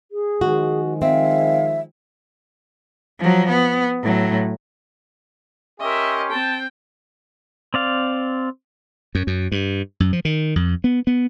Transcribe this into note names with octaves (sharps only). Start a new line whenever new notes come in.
G#4
D#3 F3 G#3 F#4
C4 E5 F5
F3 F#3
B3
A2 F#3
C#4 G4 A#4 D#5 E5 C6
C4 G5 A5
C4 D5 F5
F#2
F#2
G2
F#2
F3
D#3
F2
B3
B3